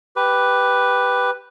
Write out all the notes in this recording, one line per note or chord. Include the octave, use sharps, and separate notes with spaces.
G4 B4